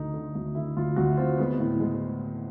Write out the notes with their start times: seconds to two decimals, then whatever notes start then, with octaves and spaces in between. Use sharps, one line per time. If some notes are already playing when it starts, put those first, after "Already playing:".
Already playing: D2 D3 D#4
0.14 D3
0.35 D2
0.55 D3 E4
0.77 D2 F4
0.96 D2 F#4
1.17 C4 F4
1.38 G#3 B3
1.60 A2
1.80 G#3